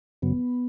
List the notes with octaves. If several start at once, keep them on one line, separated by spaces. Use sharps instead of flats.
F#2 C#3 F#3 B3